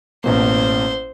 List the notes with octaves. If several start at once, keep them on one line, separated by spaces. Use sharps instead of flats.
A1 B2 A#3 C5